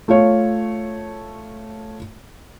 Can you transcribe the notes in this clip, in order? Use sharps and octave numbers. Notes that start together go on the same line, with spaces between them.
A3 F4 C#5